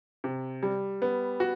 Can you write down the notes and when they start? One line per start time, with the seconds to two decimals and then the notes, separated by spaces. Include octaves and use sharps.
0.24 C3
0.63 G3
1.02 B3
1.40 F#4